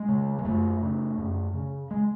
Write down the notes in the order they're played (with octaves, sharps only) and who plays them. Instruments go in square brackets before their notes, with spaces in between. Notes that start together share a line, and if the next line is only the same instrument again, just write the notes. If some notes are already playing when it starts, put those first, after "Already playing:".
Already playing: [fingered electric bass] G#3
C#3
G#3
F#2 A3
C#3
F#2
C#3
G#3